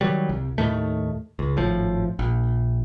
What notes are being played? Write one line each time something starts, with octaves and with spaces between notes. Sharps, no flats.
D#3 F#3 G3
C2
D#2 A2 D#3 A3
C#2
G#1 A2 F3
A#1